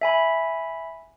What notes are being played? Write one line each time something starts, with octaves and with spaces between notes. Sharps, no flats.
E5 G#5 B5